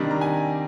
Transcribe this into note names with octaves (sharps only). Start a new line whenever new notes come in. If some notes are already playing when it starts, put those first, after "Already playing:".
Already playing: C3 D#3 G3 D4 D#5
A#5
G#5